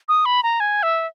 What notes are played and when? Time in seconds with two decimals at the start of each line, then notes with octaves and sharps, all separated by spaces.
0.09 D#6
0.26 B5
0.43 A#5
0.60 G#5
0.83 E5